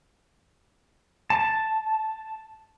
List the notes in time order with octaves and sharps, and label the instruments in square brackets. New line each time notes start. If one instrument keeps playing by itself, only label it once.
[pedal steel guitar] A5